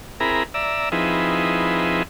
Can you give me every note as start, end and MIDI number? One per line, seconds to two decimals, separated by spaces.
0.20 0.43 60
0.20 0.43 64
0.20 0.43 68
0.20 0.43 70
0.20 0.43 82
0.20 0.43 83
0.54 0.89 74
0.54 0.89 76
0.54 0.89 82
0.54 0.89 88
0.92 2.03 53
0.92 2.03 60
0.92 2.03 63
0.92 2.03 64
0.92 2.03 68
0.92 2.03 71